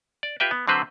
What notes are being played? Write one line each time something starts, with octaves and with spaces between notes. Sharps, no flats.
D5
F4 G4 B4 E5 G5
B3
D3 F#3 C4 B4 C5